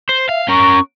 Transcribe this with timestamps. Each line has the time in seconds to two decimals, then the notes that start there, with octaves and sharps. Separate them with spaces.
0.09 C5
0.29 E5 F5
0.48 C#4 A#4 C#6